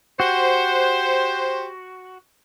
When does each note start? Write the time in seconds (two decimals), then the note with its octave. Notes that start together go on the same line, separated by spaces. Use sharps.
0.20 F#4 G4 C5